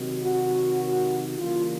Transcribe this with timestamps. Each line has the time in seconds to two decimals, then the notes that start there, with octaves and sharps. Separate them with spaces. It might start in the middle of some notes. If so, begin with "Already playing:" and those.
Already playing: C3 D#3 F#3
0.23 F#4
1.37 C#3 E3 G3 A#3 F4